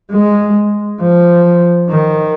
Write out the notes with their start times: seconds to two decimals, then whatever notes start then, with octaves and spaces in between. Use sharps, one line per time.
0.12 G#3
1.01 F3
1.90 D#3